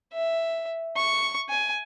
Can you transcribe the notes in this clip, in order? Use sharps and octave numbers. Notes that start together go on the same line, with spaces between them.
E5
C#6
G#5